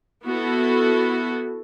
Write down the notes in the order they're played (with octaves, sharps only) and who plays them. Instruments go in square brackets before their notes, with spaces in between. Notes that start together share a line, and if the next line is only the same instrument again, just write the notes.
[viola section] B3 E4 F#4 A4